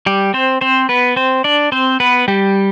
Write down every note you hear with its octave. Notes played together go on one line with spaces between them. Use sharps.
G3 G4
C4 C5
C4 C5
B3 B4
C4 C5
D4 D5
C4 C5
B3 B4
G3 G4